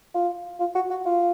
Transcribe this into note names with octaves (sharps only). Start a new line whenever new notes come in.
F4
F4
F#4
F#4
F4